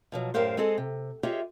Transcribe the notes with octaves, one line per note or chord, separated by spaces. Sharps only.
B2 F3 F#3
F#2 A2 G4 A#4 C5 F5
G#3 C4 G#4 A4 D#5
C3
F4 G4 G#4 C#5 D#5 E5